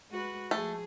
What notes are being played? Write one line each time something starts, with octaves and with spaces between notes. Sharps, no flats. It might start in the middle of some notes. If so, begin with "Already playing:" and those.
G#3 F#4 B4
F3 A3 G#4